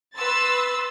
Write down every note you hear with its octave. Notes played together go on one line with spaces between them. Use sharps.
B4 C6 E6 A6